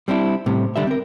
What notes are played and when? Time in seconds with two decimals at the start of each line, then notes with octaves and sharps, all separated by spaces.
0.08 G3 C4 D4 E4
0.46 A2 C3 G3
0.76 D3 G3 E5
0.87 C4 A#4